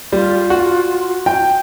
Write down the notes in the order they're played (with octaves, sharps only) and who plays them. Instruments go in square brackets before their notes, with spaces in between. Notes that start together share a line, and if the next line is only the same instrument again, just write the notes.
[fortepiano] G3 [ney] F4
[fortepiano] F#4
[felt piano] G5